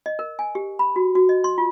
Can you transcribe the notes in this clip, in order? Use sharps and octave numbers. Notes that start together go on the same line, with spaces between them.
D#5
A#4
G#5
G4
B5
F#4
F#4
D#5
C6
F4